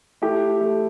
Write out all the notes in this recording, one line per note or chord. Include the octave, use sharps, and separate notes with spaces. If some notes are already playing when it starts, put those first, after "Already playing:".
A3 E4 G4
A3